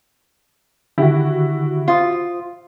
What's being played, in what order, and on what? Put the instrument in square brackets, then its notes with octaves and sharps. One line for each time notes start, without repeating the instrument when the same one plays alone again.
[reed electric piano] D3 D#3 G4 [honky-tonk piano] E4 F#4
[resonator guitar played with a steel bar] F4 [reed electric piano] C5 D#6